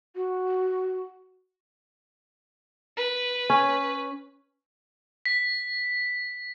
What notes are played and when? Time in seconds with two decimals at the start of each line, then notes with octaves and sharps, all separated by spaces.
0.16 F#4
2.97 B4
3.50 C#4
5.26 B6